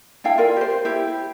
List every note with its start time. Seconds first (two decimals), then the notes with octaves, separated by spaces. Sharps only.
0.24 D4 E4 F5 G5
0.38 F4 A#4 D5
0.57 G4 C5
0.85 E4 G4